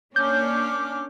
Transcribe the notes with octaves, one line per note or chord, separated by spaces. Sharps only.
A#3 C#4 D4 D6 F6 G6